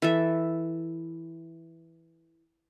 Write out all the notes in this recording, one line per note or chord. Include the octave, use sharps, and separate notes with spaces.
E3 A4 E5